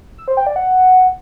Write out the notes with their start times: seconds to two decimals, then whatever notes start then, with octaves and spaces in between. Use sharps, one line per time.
0.18 E6
0.28 C5
0.37 G5
0.46 D5
0.56 F#5